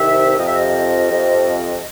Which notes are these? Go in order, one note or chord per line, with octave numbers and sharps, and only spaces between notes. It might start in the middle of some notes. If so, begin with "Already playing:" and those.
Already playing: C2 C3 D#3 E5
F2 C3 F3 D#5
E5
D#5
F2 C3 F3